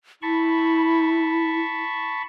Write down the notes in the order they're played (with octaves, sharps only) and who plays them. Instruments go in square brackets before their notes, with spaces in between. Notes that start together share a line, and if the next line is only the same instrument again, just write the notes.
[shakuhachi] E4 [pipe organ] A5 B5 C#6